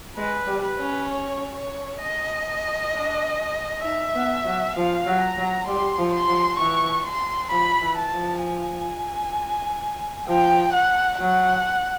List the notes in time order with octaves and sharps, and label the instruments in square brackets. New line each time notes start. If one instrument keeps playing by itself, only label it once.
[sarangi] G#3 [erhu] B4
[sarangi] G3
[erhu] B4
[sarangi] C#4
[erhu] C#5
C#5
D#5
[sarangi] D4
[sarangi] D#4 [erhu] E5
[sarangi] B3
F#3
[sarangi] F3 [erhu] F5
[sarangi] F#3
[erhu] A#5
[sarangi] F#3
[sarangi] G3 [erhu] C6
[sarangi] F3
[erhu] C6
[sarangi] F3
[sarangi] E3 [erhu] C#6
[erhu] C6
[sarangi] F3 [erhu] B5
[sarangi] E3
[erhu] A5
[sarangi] F3
[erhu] G#5
[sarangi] F3 [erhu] G5
[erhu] F#5
[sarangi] F#3 [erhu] F#5